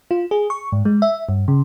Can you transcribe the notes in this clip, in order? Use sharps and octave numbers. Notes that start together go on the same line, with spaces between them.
F4
G#4
C#6
G#2
G#3
E5
G2
C#3